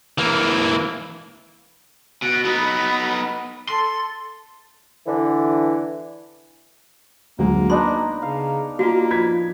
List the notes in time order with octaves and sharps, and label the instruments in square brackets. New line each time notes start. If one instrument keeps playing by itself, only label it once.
[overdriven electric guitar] E3 A#3
[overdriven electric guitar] B2 [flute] F#6
[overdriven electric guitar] B3 D#4 [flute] B5
[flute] A4 [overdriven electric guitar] C6
[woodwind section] D3 E3
[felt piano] D2 F#3 G#3 [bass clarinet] A#3
[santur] B3 D4 D#4 [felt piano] A#5 [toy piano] C6
[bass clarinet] C#3 [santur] F5
[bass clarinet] A#3 [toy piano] F4 F#4
[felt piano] F3 G#6 B6